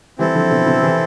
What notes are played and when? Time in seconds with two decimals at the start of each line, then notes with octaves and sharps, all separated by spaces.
0.19 E3 G3 C4 E4 A4
0.35 D3 F3
0.50 B2 D3
0.66 B2 D3
0.83 C3 E3